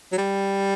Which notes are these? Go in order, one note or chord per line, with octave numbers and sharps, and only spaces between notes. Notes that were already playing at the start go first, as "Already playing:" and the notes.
F#3
G3